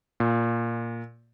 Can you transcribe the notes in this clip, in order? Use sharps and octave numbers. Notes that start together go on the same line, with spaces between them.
A#2